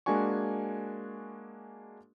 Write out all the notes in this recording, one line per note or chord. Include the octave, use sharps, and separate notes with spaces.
G#3 A#3 D4 F#4 G#5 C#6